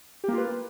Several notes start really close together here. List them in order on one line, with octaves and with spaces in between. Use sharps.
G4 A#3 F4 B4